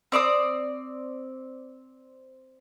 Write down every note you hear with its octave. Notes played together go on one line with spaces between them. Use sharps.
C4 D5 D6 D#6